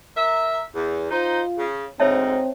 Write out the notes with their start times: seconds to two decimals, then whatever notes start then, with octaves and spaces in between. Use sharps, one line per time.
0.16 A#4 E5
0.75 E2
1.11 D#4 F4 C5
1.57 C#3
2.00 D2 G#2 C4 D#4 C#5 E5 A5